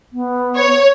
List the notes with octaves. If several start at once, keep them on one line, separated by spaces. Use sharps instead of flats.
B3
C#5